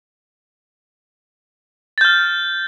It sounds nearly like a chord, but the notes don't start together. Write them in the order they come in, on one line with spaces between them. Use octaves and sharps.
A6 G6 F6